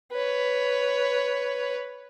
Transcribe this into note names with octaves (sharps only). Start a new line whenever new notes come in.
B4 C#5